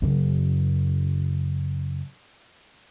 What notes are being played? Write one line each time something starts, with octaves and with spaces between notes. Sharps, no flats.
F#2 C#3